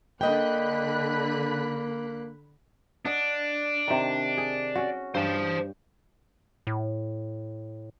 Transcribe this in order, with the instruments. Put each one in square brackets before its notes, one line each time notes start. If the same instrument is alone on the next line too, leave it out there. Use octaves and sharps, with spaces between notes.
[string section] D3 B5 F#6 [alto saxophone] A#3 [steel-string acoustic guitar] D#5 G5
[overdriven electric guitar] D4 [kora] D#5 F#5
[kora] C3 D#3
G#4
C#4 F#4
[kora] G2 G5 [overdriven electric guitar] C5 A5
[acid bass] A2